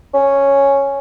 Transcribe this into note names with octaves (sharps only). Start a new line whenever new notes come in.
C#4